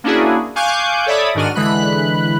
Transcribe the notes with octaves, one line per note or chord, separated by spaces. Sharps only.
A#3 C#4 D4 E4 F#4 G#4
F5 G#5 C#6 D6 F#6 G6
A4 C#5 D5 E5 B5 D#6
G#2 D#3 D4 F#4 F6 D#7
D3 E3 G#3 B5 F#6